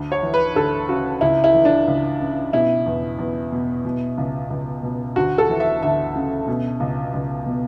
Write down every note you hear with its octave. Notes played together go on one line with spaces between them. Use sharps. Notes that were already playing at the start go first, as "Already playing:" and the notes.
Already playing: D2
C#5
E3
B4
D2 A4
C#3 F#4
C#2 E4
E4
E3
D4
C#2
C#3
B2 E4
E2
E2
B2
B2
C#2
C#2
B2
D2 F#4
A4
E3
E5
D2 E5
C#3
B2
C#2
C#2
B2